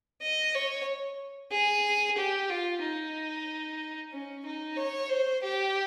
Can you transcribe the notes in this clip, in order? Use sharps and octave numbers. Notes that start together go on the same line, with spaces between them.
D#5
C#5
G#4
G4
F4
D#4
C#4
D#4
C#5
C5
G4